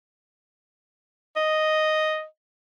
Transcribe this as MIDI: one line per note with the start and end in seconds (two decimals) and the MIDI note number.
1.36 2.24 75